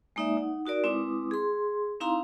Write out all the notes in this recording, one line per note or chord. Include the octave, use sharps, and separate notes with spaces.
G#3 A#3 D#4 D5 E5
D#4 F#5
D#4 F#4 A#4 D5
G#3 C4 E4 B4 D6 D#6
G#4 C6
C4 D#4 E4 F5 A#5 C6